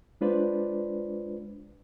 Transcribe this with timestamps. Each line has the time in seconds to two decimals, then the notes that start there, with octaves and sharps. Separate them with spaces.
0.21 G#3 D4 F4 B4 C5 D5